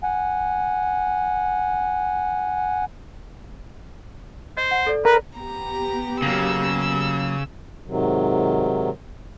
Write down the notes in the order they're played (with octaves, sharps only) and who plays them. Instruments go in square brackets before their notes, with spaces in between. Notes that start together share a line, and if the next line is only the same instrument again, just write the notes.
[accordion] F#5 G#5
[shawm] C5 [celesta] D#5
[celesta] F#5
A4 D5
[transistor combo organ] A#4 [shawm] B4
[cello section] B3 G4 [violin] A#5
[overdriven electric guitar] C#3 [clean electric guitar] F#3 A#3 [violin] E6
[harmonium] G#2 C3 D#3 F#3